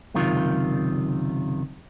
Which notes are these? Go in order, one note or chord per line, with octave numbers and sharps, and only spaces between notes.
C#2 F#2 C3 D#3 F4